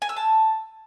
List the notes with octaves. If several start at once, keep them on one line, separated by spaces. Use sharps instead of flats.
G#5
E6
A5